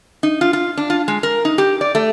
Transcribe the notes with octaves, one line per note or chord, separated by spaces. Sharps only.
D#4
F4
F4
D4
F4
G#3
A#4
D#4
G4
D5
A3